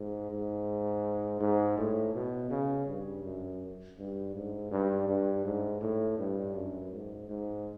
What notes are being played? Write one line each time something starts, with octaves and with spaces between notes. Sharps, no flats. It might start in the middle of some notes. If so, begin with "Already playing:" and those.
Already playing: G#2
G#2
G#2
A2
B2
C#3
G2
F#2
G2
G#2
G2
G2
G#2
A2
G2
F#2
G#2
G#2